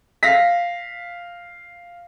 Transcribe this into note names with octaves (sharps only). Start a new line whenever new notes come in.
F5 A#6 B6